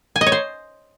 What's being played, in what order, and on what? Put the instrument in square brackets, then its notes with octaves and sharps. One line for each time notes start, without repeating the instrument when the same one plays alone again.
[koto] G#5
D#5
C#5
C5